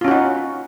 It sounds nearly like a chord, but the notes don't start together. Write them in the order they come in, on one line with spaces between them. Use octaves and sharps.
F4 C#4 F#4 D#4